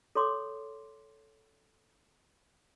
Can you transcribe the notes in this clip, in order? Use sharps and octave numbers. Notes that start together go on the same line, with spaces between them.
A4 C#5 C6 D6